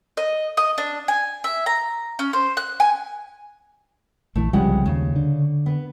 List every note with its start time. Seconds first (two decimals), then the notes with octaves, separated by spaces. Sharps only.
0.17 D#5
0.57 D#5
0.78 D4
1.08 G#5
1.44 E5
1.66 A#5
2.19 C#4
2.33 C5
2.57 F#6
2.80 G#5
4.36 A#1 E3 A3
4.53 C2 C#3 F3 G3 G#3 F#5
4.86 D#2 C#3
5.16 D3
5.66 B3